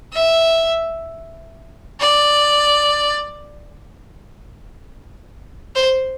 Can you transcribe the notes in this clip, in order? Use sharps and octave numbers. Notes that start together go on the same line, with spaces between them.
E5
D5
C5